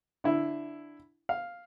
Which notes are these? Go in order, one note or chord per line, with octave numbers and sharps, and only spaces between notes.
D3 E4
F5